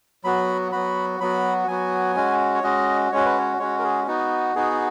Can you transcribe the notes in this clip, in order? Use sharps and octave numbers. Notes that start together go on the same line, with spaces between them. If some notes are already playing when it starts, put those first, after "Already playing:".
F#3 B3 F#4 B5
F#3 B3 F#4 B5
F#3 B3 F#4 B5
F#3 B3 F#4 G#5
G#3 C#4 F#4
C#5
G#3 C#4 F#4 D#5
G#3 C#4 F#4 C#5
B4
C#5
G#3 C#4 F#4 C#5
A#4
G#4
B3 D#4 F#4
B3 D#4 F#4 G#4